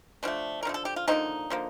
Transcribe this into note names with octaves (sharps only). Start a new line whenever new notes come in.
D3 F3 A3 D4
A#4
D3 F3 A3
A4
G4
F4
D3 F3 A#3 C4 D#4
D3 F3 A#3